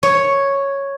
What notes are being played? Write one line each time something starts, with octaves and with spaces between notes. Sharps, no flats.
C#5